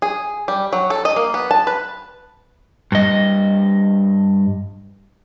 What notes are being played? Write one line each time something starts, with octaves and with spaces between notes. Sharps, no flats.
G#4
G3
F#3
A4
D#5
A#3
B3
A5
B4
G2 D#5